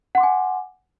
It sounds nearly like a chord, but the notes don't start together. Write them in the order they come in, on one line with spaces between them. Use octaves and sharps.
F#5 C6 D6 G#5